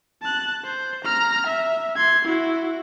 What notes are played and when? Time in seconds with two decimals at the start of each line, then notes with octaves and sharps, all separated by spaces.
0.22 A5 F#6
0.64 C5
1.05 A#5 F6
1.47 E5
1.96 C6 G#6
2.25 E4 F#4